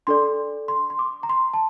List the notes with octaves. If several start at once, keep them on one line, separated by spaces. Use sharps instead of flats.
D4 A4 D5 C6
C6
C6
D6
A#5
C6
A5